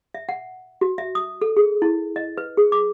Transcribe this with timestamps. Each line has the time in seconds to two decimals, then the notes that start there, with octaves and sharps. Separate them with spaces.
0.15 E5
0.29 F#5
0.81 F#4
0.98 E5
1.15 D#6
1.41 A4
1.57 G#4
1.82 E4
2.16 D#5
2.38 B4
2.57 G#4
2.72 D6